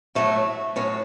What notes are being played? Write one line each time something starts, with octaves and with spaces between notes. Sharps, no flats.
A2 F#3 A3
A2 F#3 C#4